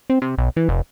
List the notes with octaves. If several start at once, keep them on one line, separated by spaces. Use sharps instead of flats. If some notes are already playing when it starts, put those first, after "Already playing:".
C4
C3
B1
E3
F1